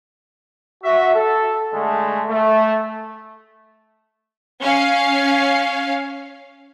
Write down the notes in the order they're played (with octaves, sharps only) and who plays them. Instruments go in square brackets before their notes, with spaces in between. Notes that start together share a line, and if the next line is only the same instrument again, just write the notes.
[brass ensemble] F#4 E5
A4
D3 G#3 A3
A3
[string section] C#4 F5